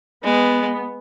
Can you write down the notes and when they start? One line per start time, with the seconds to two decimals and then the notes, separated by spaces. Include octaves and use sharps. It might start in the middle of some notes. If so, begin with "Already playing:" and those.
0.24 G#3 B3